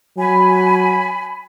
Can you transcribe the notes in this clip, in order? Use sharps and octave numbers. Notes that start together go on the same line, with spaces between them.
F#3 G#5 B5